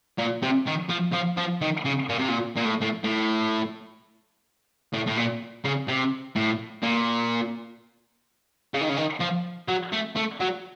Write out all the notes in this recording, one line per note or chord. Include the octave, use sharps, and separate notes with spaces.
A#2
C3
D#3
F3
F3
F3
D#3
C#3
A#2
C3
A#2
A#2
A2
A2
A2
A2
A2
A#2
C#3
C3
A2
A#2
C#3
D#3
C#3
D#3
F3
F#3
A3
A3
F#3